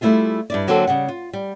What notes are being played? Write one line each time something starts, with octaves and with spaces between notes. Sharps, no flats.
G3 A3 C#4 E4 F4 G#4
G2 E4 D5
D3 F#3 A#3 C4 F#4 A4
C#3 G3 F#5
F4
G3